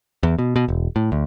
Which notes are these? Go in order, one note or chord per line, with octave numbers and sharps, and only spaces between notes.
E2
B2
B2
E1
A2
D2